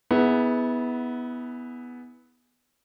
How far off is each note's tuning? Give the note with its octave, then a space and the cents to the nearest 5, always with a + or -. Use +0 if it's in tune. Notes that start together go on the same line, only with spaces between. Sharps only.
B3 +0 E4 -30 G#4 +0